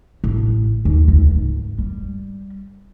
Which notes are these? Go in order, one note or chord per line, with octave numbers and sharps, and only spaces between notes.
A1
D#2
C#2
G#1
G3